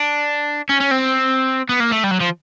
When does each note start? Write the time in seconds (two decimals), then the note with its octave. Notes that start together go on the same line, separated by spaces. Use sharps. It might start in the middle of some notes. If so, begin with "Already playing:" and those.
Already playing: D4
0.69 C#4
0.80 C#4
0.91 C4
1.69 B3
1.80 A#3
1.91 A3
2.04 G3
2.11 F#3
2.20 F3